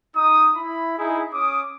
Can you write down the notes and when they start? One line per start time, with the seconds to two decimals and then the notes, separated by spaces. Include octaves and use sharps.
0.15 D#4 D#6
0.56 E4 B5
0.98 D#4 E4 G#4
1.34 C#4 D6 D#6